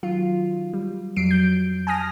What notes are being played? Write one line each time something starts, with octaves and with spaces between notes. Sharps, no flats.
D#3 F#3 F4
G3
F2 F#3 C7 D7
G6
G#5 A5 D#6 F6 A#6